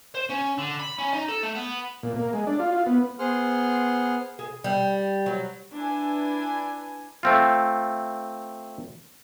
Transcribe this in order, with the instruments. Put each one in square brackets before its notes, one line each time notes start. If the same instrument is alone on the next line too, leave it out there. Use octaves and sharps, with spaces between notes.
[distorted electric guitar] C5
C#4
D3
B5
C#4
D#4
A4
A3
B3
[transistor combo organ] A#2
A#3
G#3
D4
F4
F4
B3
[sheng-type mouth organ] B3 G#4 C5 F#5 C6 F6
[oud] G#4
G3
F#3
[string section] D4 E4 B4 G#5
[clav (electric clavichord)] A3 C4 F4